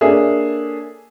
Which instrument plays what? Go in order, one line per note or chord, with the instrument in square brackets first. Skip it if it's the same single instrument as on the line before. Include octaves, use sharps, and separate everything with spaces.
[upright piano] A#3 D4 G#4 A4 C#5 E5